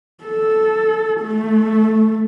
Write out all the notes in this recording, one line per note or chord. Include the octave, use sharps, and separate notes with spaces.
A4
A3